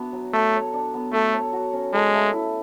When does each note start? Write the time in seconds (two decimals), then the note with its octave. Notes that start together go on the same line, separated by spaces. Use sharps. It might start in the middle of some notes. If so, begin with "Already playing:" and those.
Already playing: B3 D4 F#4 E5
0.12 F#3
0.33 A3 A4
0.54 C#5
0.74 D4
0.94 B3
1.13 A3 A4
1.34 C#5
1.53 F#4
1.73 C#4
1.94 G#3 A4
2.13 A3
2.33 E4